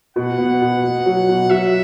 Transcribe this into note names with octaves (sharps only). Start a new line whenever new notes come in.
B2 F#5
B3
B2
B2
F#3
B2
F#3 E5